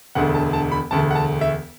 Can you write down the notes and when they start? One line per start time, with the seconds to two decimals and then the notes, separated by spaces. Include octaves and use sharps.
0.15 E1 D2 D3 F#5
0.35 A5
0.53 A5
0.72 B5
0.91 E1 D2 D3 A5
1.11 F#5
1.15 A5
1.41 E5